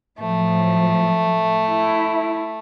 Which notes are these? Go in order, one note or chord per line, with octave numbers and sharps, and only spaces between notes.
A2 F3 F#3 A3
E4